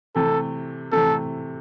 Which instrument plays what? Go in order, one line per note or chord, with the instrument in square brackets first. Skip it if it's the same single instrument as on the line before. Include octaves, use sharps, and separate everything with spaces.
[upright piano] C3 E3 A3 [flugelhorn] A4
[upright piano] C3 E3 A3 [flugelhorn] A4